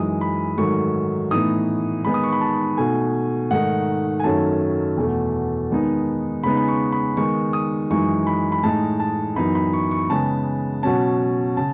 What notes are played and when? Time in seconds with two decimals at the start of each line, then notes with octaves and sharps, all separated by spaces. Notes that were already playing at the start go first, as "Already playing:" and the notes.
Already playing: F#2 E3 G#3 D#4 D#6
0.21 B5
0.57 G#2 D#3 F#3 A3 C#6
1.31 A2 E3 B3 D#4 D#6
2.04 D#3 G#3 B3 D#4 B5
2.14 D#6
2.24 C#6
2.32 B5
2.41 A5
2.77 B2 A3 D#4 G#5
3.50 G#2 D#3 A3 D#4 F#5
4.20 G#5
4.24 F#2 D#3 F#3 A3 C#4 A5
4.97 E2 B2 A3
5.71 D#3 G#3 B3 D#4
6.43 C#3 G#3 B3 D#4 B5
6.57 B5
6.68 C#6
6.92 B5
7.17 D#3 G#3 B3 D#4 C#6
7.53 D#6
7.90 F#2 E3 G#3 D#4 C#6
8.27 B5
8.52 B5
8.63 A2 G#3 D#4 A5
9.00 A5
9.36 F#2 E3 B3 D#4 B5
9.55 B5
9.73 C#6
9.91 C#6
10.10 C#3 G#3 B3 A5
10.83 B2 F#3 C#4 A5
11.57 C#3 A5